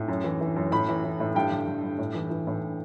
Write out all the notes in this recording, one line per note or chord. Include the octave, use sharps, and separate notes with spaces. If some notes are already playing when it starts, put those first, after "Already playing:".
Already playing: A2
F#2
E3
E3
F#2
A2 B5
E3
E3
A2
G2 G5
D3
D3
G2
A2
E3
E3
A2